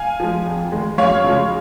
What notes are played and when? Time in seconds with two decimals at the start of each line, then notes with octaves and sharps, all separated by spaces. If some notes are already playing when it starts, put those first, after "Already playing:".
Already playing: F5 G#5
0.20 F3 G#3
0.46 F2
0.72 D#3 G#3
0.98 F#2 C#5 F5
1.24 C#3 F3 G#3